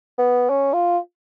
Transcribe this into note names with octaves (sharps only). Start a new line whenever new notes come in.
B3
C#4
F4